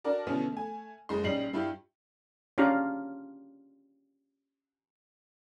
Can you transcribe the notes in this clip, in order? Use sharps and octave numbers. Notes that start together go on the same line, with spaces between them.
D4 F#4 A#4 D5 A5
B2 D3 E3 F3 B3 C#4
A3 G#5
F#1 G#3 C6
A#1 G3 C#4 D#4 C7 F#7
G2 E4 F4 G4
C#4 D4 F4 G4 F5 A#5